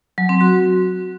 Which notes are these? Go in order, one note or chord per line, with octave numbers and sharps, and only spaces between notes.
F#3
C4
F#4